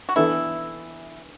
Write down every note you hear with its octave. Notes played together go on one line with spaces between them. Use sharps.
F#4
E3 B3 D4 E4 A4